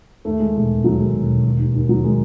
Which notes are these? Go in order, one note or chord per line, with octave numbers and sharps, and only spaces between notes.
D#2 A3
D#3 G#3
E1 G#3
E1
D#2 F#3
D#3 G#3
E1
E1
D#3
D#2
D#2
D#3 F#3
D#3 G#3